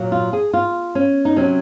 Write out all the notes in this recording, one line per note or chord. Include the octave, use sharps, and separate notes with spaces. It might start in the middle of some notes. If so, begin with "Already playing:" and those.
Already playing: A#2 F#3
F4
G#4
F4
C#4
D#4
C3 F#3 C#4